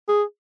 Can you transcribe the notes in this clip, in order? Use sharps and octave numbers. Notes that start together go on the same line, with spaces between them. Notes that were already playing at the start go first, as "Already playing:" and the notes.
G#4